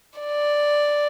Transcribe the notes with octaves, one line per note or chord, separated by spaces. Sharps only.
D5